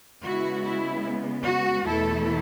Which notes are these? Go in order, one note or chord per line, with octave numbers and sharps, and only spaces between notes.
C#3 G#3 B3 E4 F#4
E4
F#4
E2 B2 A3 E4 A4